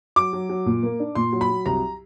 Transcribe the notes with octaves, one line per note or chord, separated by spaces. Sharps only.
F#3 D6
F#3
F#3
A#2
A#3
D4
A#2 C6
F#3
B5
F#3
C2 A#5